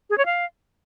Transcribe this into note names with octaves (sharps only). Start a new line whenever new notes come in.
G#4
C#5
F5